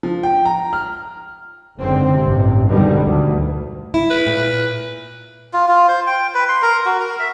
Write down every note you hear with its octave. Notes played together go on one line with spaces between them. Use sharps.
F3
G5
A#5
F6
F#1 G#2 D3 C4
A1 G2 C3
F2 G#2 B2 D3 D#3 G3
D2
E4
B4
A#2
F4
F4
C5
G5
B4
C6
A#4
F#4
A#4
E5